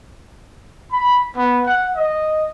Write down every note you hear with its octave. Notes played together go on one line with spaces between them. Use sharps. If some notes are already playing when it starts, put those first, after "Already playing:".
B5
B3
F#5
D#5